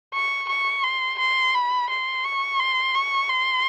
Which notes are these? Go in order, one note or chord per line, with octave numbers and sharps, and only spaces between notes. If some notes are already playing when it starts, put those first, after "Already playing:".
C#6
C#6
C6
C6
B5
C6
C#6
C6
C#6
C6